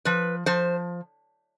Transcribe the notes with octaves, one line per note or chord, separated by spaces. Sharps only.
F3 B4
F3 C5